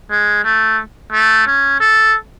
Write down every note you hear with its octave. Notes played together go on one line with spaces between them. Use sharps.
G#3
A3
A3
C#4
A4